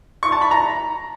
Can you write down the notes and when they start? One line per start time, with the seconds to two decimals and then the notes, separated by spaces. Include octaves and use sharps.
0.23 C#6
0.32 A5
0.42 B5
0.51 A#5